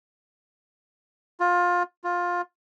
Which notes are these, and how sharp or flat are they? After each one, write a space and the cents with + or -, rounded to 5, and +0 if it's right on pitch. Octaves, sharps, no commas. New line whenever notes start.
F4 +20
F4 +15